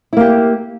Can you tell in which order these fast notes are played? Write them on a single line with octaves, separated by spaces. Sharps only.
E4 A#3 G4